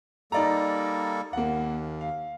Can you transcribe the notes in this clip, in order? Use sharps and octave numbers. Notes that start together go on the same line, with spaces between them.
G3 A#3 D#4 A4 D5 A#5
D#2 A#3 F#5
F5